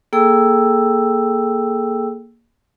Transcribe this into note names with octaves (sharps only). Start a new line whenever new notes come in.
A#3 G#4 A4 G5 E6